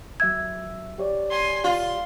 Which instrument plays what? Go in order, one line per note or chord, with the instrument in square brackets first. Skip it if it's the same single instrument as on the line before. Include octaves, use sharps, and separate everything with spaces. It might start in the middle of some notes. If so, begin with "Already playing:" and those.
[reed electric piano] F#3 E5 E6 [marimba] G#6
[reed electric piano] G4 C#5 D5
[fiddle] G#5 C6
[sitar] F4 [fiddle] C6